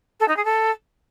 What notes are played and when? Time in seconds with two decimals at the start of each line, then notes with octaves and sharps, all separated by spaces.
0.20 A4
0.28 D#4
0.37 G#4
0.45 A4